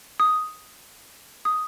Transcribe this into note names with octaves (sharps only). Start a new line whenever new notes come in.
D#6
D#6